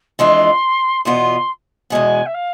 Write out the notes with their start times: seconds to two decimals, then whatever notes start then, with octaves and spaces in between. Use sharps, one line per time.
0.19 F2 E3 G#3 D4 F4 C6
1.05 E2 B2 B3 F4 C6
1.90 E2 B2 G#3 B3 G#5
2.26 E5
2.34 F5